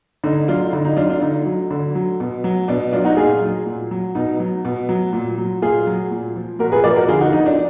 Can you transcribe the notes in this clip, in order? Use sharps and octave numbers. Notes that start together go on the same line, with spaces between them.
D3 D#4
F#3 D4 F4
D3 D#4
D#4
F#3 D4 F4
D4 F4
D3 D#4
F#3
D3
F#3
B2
F#3
B2 D4
F#3 D4 F4
D#4 F#4
A#2 F4 G#4
F#3
A#2
F#3
B2 D#4
F#3
B2
F#3
A#2
F#3
A#2 F4 G#4
F#3
A#2
F3
A#2 F#4 A#4
G#4 B4
F3 A#4 D5
F#4 A#4
D3 F4 G#4
D#4 F#4
F3 D#4
D4